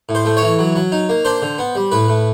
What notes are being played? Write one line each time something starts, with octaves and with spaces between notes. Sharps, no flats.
A2
C5
A3
C#5
E3
F#3
F#3
D#4
A#3
D4 C5
D3
B3
G3
A2 B4
A2